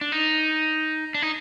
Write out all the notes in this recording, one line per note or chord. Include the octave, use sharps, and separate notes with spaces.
D4
D#4
D4
D#4